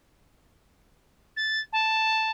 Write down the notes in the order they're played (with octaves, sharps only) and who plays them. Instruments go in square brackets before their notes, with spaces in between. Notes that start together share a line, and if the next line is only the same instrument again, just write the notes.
[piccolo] A6
A5